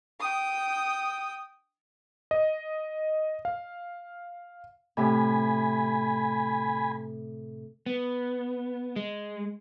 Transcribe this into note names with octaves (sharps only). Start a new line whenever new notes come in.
G5 D#6
D#5
F5
A2 C3 G#5 B5
B3
G#3